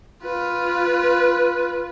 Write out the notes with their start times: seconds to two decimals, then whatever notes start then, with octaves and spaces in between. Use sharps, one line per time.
0.23 F4 B4